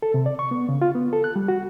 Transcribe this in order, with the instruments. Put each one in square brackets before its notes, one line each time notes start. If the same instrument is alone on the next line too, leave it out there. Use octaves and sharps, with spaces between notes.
[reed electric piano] A4
C3
D5
C#6
B3
C#3
F4
B3
A4
F#6
G3
F#4